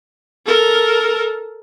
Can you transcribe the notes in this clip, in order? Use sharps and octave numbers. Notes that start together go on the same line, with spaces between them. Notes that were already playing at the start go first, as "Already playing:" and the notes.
A4 A#4